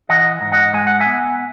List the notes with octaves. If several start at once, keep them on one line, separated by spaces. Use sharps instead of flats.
E3 D#5 F#5
G#2
D#5 F#5
G#3 G#5
F#5
E5 G#5
B3